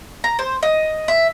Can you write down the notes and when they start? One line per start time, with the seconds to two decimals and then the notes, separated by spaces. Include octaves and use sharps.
0.24 A#5
0.39 C5
0.63 D#5
1.08 E5